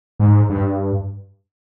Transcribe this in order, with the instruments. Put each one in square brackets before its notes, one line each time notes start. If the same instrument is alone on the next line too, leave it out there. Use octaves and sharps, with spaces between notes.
[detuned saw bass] G#2
G2